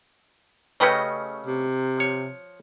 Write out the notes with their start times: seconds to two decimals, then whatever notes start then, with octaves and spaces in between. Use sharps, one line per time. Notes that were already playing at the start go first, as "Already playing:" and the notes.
0.80 C#3 A3 C#4 G4 B4 D#5
1.46 C3
1.98 F3 C#5